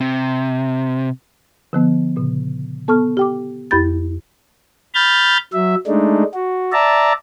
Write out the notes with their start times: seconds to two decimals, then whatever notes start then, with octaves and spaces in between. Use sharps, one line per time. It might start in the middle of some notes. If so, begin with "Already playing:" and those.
0.01 C3
1.73 D3 F3 B3
2.16 A#2 C#3
2.88 B3 A4 A5 C#6 F6
3.17 G4 G5 D6
3.71 F2 E4 G4 B5 G6 A6
4.95 B5 F6 G6 A6
5.53 F#3 E5
5.87 G#3 A3 D4 D#4
6.34 F#4
6.73 D5 E5 A5 A#5